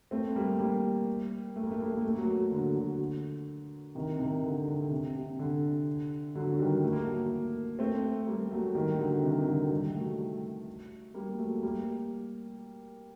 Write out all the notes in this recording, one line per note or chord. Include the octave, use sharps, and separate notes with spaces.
A3 C4
G3 A#3
G3 A#3
A3
A#3
A3
A#3
A3
A#3
A3
A#3
F#3 A3
D3 F#3
D3 F#3
C3 D#3
C3 D#3
D3
D3
C3
C3
D3
D3 F#3
F#3
D#3 G3
A3
A#3
F#3 A3
A3 C4
G3 A#3
F#3 A3
D#3 G3
D3 F#3
C3 D#3
D#3
D3 F#3
D#3 G3
F#3 A3
G3 A#3
F#3 A3
G3 A#3